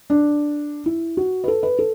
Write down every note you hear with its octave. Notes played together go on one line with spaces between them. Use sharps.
D4
E4
F#4
B4
A4
B4
A4